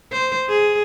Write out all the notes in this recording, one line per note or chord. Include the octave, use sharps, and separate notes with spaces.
C5
G#4